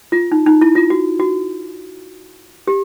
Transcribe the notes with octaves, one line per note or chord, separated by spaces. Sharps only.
F4
D#4
D#4
E4
F4
F#4
F#4
G4